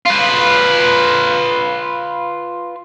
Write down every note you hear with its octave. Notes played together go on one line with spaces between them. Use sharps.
F4 B4